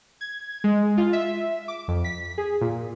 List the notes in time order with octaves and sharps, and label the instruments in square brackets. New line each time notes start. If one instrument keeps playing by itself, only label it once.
[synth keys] G#6
G#3
F4
E5
D6
F2
B6
G#4
A#2